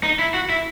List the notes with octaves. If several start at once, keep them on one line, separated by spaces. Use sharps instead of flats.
D#4
E4
F#4
E4